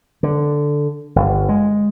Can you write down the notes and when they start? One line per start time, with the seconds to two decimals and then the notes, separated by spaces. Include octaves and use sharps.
0.23 D3
1.16 G1
1.49 G#3